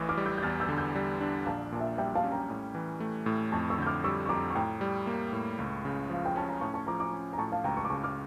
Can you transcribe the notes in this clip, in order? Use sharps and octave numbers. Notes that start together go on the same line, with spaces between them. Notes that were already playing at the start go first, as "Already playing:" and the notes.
Already playing: A1 A2 E3
D6 F6
G3
E6 G6
G6
E2 F6 A6
E6 G6
D3
E6 G6
G3
D4
A#1 F5 A5
A#2 A5
E5 G5
G3 E5 G5
F5 A5
C#4
G5 A#5
A2
E3
A3
A2
F2 A5 C#6
C#6 E6
D3 G6
D6 F6
G3 C#6 E6
C#6
F2 A#5 D6
C#6
A2 G5 A#5
G3
A#3
A2
C#2
C#3
F3 F5
G5
C#4 A5
A#5
A2 A5 C#6
A5 C#6
F3 A#5 D6
A#5 D6
C#4
A#5
A2 A5 C#6
F5 A5
C#2 G5 A#5
A5 C#6
D6
C#3 A5 C#6
D6 F6